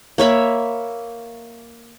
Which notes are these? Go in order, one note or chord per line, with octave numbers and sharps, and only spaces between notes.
A#3 C#5 E5 B5